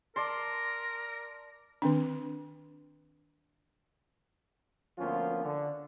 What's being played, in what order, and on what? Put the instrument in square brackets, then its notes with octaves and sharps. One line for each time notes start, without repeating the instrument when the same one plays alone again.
[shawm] A#4 [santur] D5 A5 C6
[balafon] D#3 C4 D4
[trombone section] D2 F3 A#3 B3 C#4 F4
D3